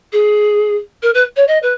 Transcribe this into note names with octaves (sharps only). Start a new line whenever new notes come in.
G#4
A#4
B4
C#5
D#5
B4